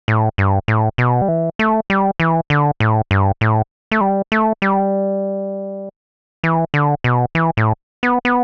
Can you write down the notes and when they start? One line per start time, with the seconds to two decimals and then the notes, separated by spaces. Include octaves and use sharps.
0.08 A2
0.38 G2
0.68 A2
0.98 B2
1.22 G3
1.28 E3
1.59 A3
1.90 G3
2.20 E3
2.50 D3
2.80 A2
3.11 G2
3.41 A2
3.92 A3
4.01 G3
4.32 A3
4.62 G3
6.44 E3
6.74 D3
7.04 B2
7.35 E3
7.57 A2
8.03 B3
8.25 B3